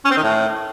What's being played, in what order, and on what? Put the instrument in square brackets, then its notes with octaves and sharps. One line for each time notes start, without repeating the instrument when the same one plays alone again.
[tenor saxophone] C#4
C4
D#3
A2